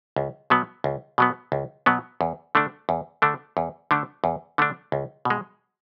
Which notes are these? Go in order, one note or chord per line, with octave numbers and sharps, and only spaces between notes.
C#2
B2 F#3 B3
C#2
B2 F#3 B3
C#2
B2 F#3 B3
E2
D3 A3 D4
E2
D3 A3 D4
E2
D3 A3 D4
E2
D3 A3 D4
C#2
B2
G#3